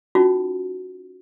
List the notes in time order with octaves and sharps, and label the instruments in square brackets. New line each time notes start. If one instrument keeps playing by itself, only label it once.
[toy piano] C#4 D#4 F4 F#4